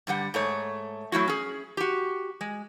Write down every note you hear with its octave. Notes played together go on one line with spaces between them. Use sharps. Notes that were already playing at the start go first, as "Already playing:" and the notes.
G2 D3 G3 F#5
G#2 A3 C#5
F#3 A3 E4 F#4
C#4 G#4
F#4 G4
G#3